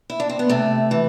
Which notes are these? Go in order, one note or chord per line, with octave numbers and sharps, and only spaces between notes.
E4
D4
C4
B3
C3 A3
E3